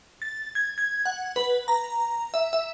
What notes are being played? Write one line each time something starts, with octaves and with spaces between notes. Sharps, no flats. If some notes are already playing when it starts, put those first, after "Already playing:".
A6
G#6
G#6
F#5
B4
A#5
E5
E5